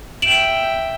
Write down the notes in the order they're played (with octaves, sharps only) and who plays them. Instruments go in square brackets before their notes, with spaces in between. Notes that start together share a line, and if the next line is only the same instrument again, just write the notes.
[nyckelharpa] E5 G5 [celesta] D7 E7 F#7